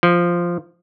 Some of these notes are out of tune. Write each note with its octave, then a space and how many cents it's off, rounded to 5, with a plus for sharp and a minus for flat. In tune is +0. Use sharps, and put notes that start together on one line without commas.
F3 -5